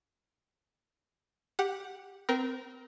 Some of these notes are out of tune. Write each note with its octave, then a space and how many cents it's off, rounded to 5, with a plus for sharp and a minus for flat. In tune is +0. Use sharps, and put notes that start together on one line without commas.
G4 +5 F#5 -5
C4 -25 A#4 +15